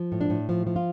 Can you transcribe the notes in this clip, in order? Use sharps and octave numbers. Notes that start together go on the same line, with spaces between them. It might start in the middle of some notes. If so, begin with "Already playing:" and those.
Already playing: F3
A2
D4
A2
F3
F3
F4